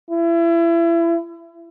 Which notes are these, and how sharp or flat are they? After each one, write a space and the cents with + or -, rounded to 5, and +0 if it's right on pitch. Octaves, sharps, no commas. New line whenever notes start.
E4 +30